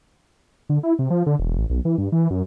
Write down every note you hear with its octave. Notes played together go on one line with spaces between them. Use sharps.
D3
E4
C3
F3
D3
E1
A1
B1
E3
G2
E3
F#2